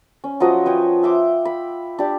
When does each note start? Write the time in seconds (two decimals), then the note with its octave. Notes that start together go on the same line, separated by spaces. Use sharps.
0.24 C#4
0.40 F3 F#3 B4 D#5
0.66 B4 C#5 G5
1.03 E5 C6 D6
1.45 B5
1.99 D4 G4